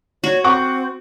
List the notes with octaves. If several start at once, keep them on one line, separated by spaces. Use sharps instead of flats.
F#4 C#5
C4 F#5 C#6 D6